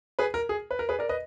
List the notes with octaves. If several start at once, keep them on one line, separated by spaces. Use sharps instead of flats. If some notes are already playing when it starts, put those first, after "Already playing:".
G#4 B4
A#4
G#4
B4
A#4
G#4 B4
A#4 D5
B4 D#5